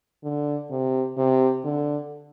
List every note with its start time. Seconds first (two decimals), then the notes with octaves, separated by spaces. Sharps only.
0.23 D3
0.71 C3
1.17 C3
1.64 D3